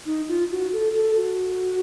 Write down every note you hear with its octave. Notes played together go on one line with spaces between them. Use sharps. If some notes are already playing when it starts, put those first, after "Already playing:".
D#4
F4
F#4
A4
A4
F#4